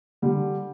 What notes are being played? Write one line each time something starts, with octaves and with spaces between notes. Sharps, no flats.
D3 G3